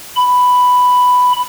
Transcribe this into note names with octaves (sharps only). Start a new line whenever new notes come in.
B5